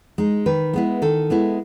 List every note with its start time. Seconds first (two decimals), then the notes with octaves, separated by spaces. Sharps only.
0.18 G#3 D#4
0.46 D#3 B4
0.73 G#3 B3 E4
1.02 D#3 A4
1.30 G#3 B3 E4